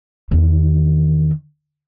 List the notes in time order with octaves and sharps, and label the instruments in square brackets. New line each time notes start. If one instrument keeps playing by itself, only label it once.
[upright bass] E2 D#3